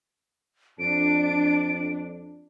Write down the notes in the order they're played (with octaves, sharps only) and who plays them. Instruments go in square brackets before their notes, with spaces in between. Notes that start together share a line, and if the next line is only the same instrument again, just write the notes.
[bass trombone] F2 [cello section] D4 [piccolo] D7